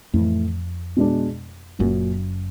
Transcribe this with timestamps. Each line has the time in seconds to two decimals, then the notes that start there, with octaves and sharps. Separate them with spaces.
0.13 F2 A2 E3 A3
0.97 B2 G#3 B3 D4
1.79 F#1 F#2 A#2 F#3 A#3 C#4 F#4